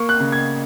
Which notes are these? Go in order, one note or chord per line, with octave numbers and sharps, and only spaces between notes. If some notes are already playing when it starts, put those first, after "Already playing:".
Already playing: A#3 C#6
F#6
C#3
G#6